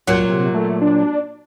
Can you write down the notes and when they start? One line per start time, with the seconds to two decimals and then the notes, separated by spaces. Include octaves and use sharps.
0.07 C#2 A#2 F#3
0.26 C3
0.54 A3
0.81 D4